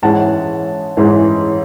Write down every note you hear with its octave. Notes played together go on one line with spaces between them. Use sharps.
G#2 E3 G#3 C#4 E4 F#5 A5
G#2 E3 G#3 C#4 E4